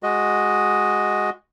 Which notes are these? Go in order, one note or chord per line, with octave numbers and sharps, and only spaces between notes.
G#3 F#4 D#5